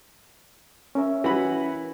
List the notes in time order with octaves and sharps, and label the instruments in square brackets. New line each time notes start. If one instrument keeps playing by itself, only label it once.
[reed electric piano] C#4 A#4 E5
[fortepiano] E3 F#4 B5